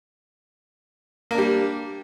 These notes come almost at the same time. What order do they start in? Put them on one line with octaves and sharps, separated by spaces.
A#3 D4 G3